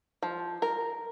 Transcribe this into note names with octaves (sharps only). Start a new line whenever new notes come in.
F3
A#4